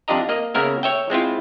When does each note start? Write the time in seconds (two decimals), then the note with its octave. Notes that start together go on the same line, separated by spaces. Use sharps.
0.08 F2 D4 F4 G4 D#5 A#5
0.29 A#3 D#5
0.54 C#3 A#3 B3 A#4 E5
0.83 C#5 E5 G5
1.10 G#3 C4 E4 F4